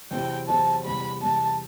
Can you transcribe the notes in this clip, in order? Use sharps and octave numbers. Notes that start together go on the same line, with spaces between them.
E2 C3 F#3 C4 E4 G5
E2 C3 F#3 C4 E4 A5
E2 C3 G3 B5
E2 C3 G3 A5